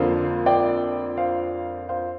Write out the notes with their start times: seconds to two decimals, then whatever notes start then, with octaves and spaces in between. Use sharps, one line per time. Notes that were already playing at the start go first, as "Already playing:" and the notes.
Already playing: F2 D3 F3 A#3 C5 F5
0.46 D5 G5
1.17 C5 F5
1.89 C5 F5